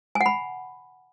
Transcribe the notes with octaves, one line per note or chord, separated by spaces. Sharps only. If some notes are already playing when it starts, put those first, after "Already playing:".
G#5
F#5
B5